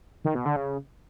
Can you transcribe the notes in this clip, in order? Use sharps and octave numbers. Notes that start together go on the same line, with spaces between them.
D#3
B2
D3
C#3